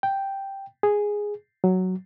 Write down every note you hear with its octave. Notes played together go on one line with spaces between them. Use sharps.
G5
G#4
F#3